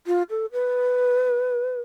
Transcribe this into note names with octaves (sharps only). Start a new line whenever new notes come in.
F4
A4
B4